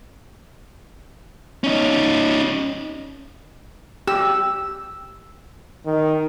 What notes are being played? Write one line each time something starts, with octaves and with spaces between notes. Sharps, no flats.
C#4 D#4
G4 E6
D#3